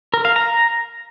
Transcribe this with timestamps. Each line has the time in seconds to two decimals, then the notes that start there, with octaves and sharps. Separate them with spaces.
0.14 A#4
0.25 F5
0.36 A#5